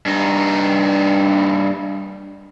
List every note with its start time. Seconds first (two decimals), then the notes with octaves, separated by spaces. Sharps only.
0.06 G2 D#4